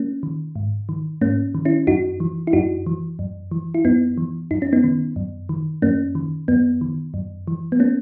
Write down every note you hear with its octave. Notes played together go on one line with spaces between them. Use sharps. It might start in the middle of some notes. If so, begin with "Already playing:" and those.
Already playing: A#3 C#4
D#3
G#2
D#3
G#2 A#3 C#4
D#3
C#4 E4
F#2 D#4 F#4
E3
E4
F#2 D#4 F#4
E3
F#2
E3
E4
F#2 B3 D#4
E3
F#2 D#4
C#4
B3 D#4
D#3
F#2
D#3
F#2 A#3 C#4
D#3
F#2 B3
D#3
F#2
E3
B3
A#3 C#4